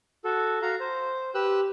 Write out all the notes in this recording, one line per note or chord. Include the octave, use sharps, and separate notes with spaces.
F#4 A4
F#4 F5 A#5
C5
G4 B4 E6 F#6